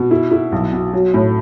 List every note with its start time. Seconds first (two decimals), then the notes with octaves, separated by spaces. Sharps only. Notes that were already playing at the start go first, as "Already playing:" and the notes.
Already playing: B2
0.11 E4
0.31 E4
0.52 B1
0.73 B2
0.93 F#3
1.14 A2